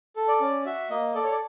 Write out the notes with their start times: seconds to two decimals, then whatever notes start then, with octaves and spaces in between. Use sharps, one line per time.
0.16 A4
0.28 D5
0.40 C#4
0.66 F#4 E5
0.90 A#3 D#5
1.15 A4 D5
1.23 C#5
1.31 D5